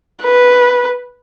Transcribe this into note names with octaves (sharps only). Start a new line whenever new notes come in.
B4